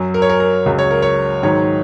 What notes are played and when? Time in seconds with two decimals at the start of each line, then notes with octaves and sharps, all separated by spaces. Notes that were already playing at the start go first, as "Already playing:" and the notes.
Already playing: F#2 F#3
0.14 A#4
0.22 C#5
0.29 A#4
0.40 A#4
0.66 C#2 C#3 F#3
0.79 C#5
0.91 A#4
1.02 C#5
1.43 G#2 D#3 F#3 C#5